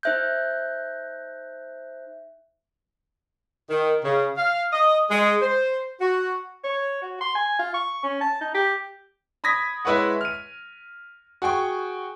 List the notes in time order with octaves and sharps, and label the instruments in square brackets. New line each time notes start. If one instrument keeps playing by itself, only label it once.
[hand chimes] D#4 C5 E5 F#6 G6
[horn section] D#3
C#3
F5
D#5
G#3
C5
F#4
[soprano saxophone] C#5
F#4
C6
G#5
F4
C#6
C#4
A5
D#4
G4
[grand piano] B5 D#6 G#6 A#6 B6
G#3 E4 B4 C#5 F#5
F6 D#7
F#4 G#4 G5 C#6